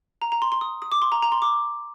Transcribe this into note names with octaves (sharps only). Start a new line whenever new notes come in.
A#5
A#5
C6
C6
D#6
D#6
D6
C6
A#5
A#5
C6
D6